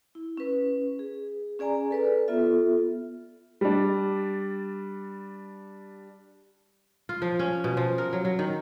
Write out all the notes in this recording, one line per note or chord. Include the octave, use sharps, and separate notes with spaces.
E4
C#4 B4
G#4
C#4 G#4 D5 G#5 A#5
A4 B4 D5
B3 F4 A4 E5
G3 D4
F4
F3
C#4
B2
F3
A#4
F#3
F#3
D#3